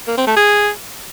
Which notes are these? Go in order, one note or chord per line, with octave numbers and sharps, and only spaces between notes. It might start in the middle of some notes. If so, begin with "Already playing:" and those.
A#3
C4
A3
G#4